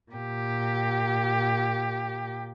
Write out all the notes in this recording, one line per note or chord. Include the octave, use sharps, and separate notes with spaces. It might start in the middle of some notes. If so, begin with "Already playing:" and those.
A#2 G4